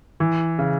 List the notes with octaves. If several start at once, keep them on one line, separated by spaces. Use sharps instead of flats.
E3
C#3